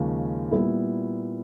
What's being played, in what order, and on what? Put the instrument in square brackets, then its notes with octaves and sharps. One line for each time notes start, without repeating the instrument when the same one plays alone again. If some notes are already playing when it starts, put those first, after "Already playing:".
Already playing: [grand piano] D#2 C#3 F3 G#3
A#2 G3 B3 E4